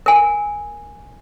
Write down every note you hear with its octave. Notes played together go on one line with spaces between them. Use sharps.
A#4 G#5